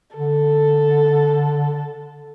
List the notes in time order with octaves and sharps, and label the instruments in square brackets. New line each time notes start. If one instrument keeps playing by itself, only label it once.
[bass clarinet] D3 [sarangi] A4